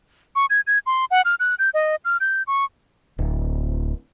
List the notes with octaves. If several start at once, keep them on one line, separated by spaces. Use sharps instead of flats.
C#6
G#6
G#6
C6
F#5
F6
F#6
G6
D#5
F6
G6
C#6
D1